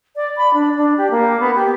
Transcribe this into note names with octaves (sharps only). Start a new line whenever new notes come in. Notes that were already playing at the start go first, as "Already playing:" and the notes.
D5
B5
D4
D4
G4
A#3
B3
G4